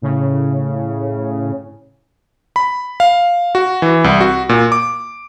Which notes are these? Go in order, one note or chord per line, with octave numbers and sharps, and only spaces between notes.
A2 C#3
B5
F5
F#4
E3
C2
F#4
A#2
D6